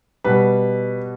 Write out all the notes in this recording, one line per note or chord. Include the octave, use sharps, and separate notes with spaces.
B2 G3 B4